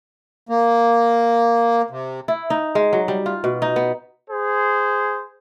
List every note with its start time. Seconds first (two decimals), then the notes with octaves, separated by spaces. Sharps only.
0.49 A#3
1.90 C3
2.28 E4
2.50 D#4
2.75 G#3
2.93 F#3
3.08 G3
3.26 F4
3.44 B2
3.62 D#4
3.76 B3
4.29 G#4 C5